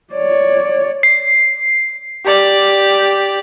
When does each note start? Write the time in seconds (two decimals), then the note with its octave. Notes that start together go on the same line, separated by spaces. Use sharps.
0.13 C#5 D5
1.03 C7
2.25 G4 D5